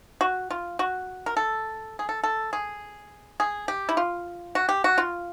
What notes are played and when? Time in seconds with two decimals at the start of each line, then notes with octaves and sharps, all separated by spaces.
0.21 F#4
0.50 F4
0.79 F#4
1.26 A#4
1.37 A4
1.99 G#4
2.09 A4
2.24 A4
2.53 G#4
3.40 G#4
3.68 G4
3.89 E4
3.97 F4
4.55 F#4
4.69 G4
4.84 F#4
4.98 F4